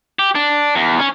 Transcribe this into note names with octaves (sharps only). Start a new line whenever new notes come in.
G4
D4
E2
C#4